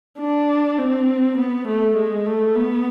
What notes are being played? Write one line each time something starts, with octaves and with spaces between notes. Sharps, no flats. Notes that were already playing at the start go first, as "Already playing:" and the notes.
D4
C4
B3
A3
G#3
A3
B3